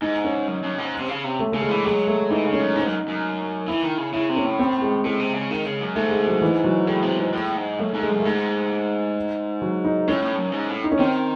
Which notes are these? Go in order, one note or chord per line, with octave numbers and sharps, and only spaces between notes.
G#2 D#4
C#4
F#2
F#2
G#2
C3
C#3
C3
A3
C#3 A3
G#3
E3
F#3 G#3
A3
E3 D#4
C#3
C#4
F#2
G#2 D#4
F#2
F#2
E3 E4
D#3
C#3
C#3 E4
C3
C#4
A2
C4
G#3
A2 G#3
C3
C#3
D#3
C#3
F#2
G#2 A3
G#3
F#3
E3
F#3
A2 G#3
C3
G#2
A2
G#2
F#2 A3
G#2
G#3
F#2
A3
G#2 G#3
F#3
D#4
A2 C#4
A2
F#2
G#2
A2
D#4
C#4
D#3 C4